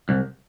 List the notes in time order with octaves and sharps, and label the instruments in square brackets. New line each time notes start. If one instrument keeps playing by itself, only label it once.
[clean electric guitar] C2